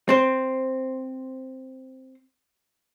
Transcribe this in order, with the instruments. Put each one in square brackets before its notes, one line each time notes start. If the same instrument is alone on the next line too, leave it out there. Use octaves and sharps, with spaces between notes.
[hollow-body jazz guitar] C4 C5